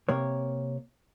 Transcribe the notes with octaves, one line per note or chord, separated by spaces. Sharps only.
C3 A#3 A#4 C#5